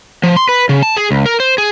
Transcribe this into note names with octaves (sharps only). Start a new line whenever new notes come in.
F3
C6
B4
C#3
A5
G#4
C#2
A#4
C5
G#4